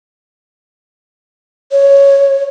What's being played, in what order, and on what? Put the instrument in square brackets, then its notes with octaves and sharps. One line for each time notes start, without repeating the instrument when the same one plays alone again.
[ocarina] C#5